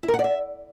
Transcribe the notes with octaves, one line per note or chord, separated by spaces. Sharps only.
E4
A#4
F#5
D5
E5